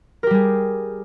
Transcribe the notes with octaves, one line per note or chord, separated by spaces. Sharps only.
G3 G4 G#4 A#4